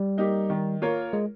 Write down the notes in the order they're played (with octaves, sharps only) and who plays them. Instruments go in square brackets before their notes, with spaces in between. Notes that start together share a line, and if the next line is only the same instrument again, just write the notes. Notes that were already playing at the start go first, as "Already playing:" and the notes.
Already playing: [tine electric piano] G3
[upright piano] A#3 D#4 G4
D#3
A#3 F4 A#4 C#5
[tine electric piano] G#3